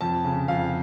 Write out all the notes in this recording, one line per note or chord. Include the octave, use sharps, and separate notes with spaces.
F2 A5
C#3
F2 F5